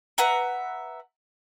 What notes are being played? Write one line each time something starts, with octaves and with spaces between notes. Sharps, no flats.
B4 E5 F#5 A#5